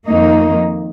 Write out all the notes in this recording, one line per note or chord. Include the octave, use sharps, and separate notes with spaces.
F2 D#3 A#3 D#4